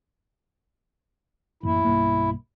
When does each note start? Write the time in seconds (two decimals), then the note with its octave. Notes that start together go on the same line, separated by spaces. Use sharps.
1.63 A1 F#2 A#3 E4
1.85 B1 G2 A#3